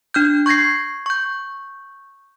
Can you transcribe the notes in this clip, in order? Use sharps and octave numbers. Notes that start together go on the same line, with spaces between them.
D4 F6 G6
C#6 G6 G#6 A#6 C7
C#6 G6